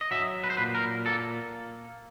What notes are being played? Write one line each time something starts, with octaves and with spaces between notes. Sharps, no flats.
D#5
F#3 E5
B4
C5
A#2 B4
A#4
A#3 A4